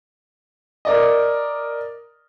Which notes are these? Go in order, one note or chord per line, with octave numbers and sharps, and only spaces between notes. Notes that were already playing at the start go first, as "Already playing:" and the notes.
A#4 D5 D#5